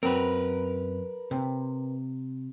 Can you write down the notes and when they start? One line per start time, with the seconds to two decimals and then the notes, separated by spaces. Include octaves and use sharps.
0.03 F#2 C4 A#4 B4
1.31 C3